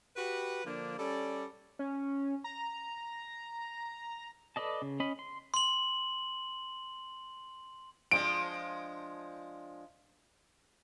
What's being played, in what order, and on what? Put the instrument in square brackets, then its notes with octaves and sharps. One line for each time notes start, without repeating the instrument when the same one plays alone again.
[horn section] F#4 G4 B4
D3 F3 A#3 D4
G3 C#4 A4 D5
[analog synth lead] C#4
A#5
[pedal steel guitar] A4 B4 D5 D#5 A5
C#3
C#4 D#5 B5
C6
[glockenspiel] C6 F#7
[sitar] F3 G#3 D4 [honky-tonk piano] D7